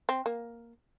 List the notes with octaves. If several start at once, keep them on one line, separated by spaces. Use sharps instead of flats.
C4
A#3